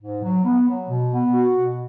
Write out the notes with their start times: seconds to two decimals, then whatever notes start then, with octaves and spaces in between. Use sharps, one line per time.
0.01 G#2
0.22 F#3
0.44 B3
0.67 F#3
0.89 B2
1.11 B3
1.33 F#4
1.55 B2